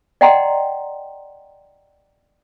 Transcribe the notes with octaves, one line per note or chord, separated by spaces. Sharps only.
D5 D#5 F#5 G5 A#5 C6